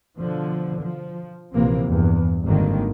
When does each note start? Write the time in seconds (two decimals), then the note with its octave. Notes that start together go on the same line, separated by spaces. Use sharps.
0.18 B2 D3 F3
0.81 F3
1.52 A#1 C3 E3 F3 A#3 C4
1.87 E2 G2
2.45 G#1 F#2 D3 D#3 G3 A#3